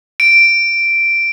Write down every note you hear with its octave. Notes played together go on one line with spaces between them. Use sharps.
D7